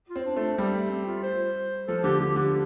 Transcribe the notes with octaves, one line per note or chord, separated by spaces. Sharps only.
F4
C4
D4
A3
D4
G3 C4
A3
C4
F4
C5
F3 A4
D3 G4
D3 G4
D3 G4